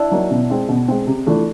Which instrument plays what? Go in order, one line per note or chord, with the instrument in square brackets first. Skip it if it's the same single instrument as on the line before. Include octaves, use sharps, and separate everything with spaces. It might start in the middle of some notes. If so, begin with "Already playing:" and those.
Already playing: [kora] D4 E4
[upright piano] F#3 A#3 D#4
B2
G#3 C4
B2
G#3 C4
C3
E3 A3 D4 F4